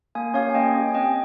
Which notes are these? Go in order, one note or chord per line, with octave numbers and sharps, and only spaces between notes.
A#3 F5 G#5
C#4 G4 C#5 F5
G#5
A#3 D#5 G5
C#4 G4
G#5
C4 D#5 G5